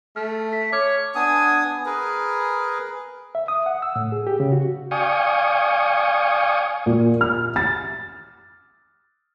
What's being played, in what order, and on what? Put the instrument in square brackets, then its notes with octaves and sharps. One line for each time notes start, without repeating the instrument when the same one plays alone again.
[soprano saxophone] A3 [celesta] F6
[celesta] B6
[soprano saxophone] C#5 [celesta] D6 F6 G#6
[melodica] B3 D4 G#5 D#6
G#4 A#4 B4
[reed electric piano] E5
D#6
F#5
E6
A2
G#4
G4
C#3
F#4
[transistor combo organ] D5 F5 G5 G#5 C#6 D#6
[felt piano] A#2
F6
A6